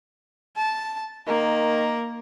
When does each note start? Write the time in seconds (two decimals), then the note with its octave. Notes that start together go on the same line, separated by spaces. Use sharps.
0.57 A5
1.28 D#3 A#3